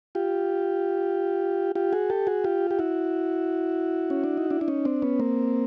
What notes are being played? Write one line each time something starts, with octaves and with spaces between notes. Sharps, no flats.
F4 G4
F4 G4
F#4 G#4
G4 A4
F#4 G#4
F4 G4
G4
E4 F#4
C#4
D4
D#4
D4 E4
D4
C#4 D#4
C4 D4
B3 C#4
A#3 C4